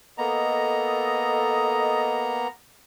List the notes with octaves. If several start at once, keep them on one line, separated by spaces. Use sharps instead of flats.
A#3 B3 A4 D#5 A#5